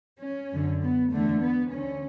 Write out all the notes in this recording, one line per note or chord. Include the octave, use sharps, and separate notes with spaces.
C#4
F#2 D3
B3
E2 D3 A3
B3
D2 D3 C#4